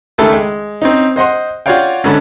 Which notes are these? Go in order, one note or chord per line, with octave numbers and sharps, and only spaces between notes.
C#2 D#3 A3 A4 E5 B5
G#3
C4 C#4 D#4
C5 D#5 F#5 C6
F4 F#4 C#5 D5 F5 G5
G#2 D3 C#4 A4 A5 B5